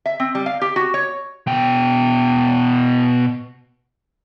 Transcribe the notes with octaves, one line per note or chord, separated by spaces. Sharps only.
E5
C4
G3
F5
G4
F#4
C#5
B2 G5